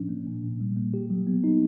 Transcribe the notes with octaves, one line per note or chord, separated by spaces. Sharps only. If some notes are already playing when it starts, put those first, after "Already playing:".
Already playing: A2 F3 C#4 D4
A#3
A#2
A#2
G3
A#3
G4
F#3
B3
D#4